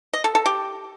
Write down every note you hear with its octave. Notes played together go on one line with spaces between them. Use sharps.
D#5
A4
A4
G4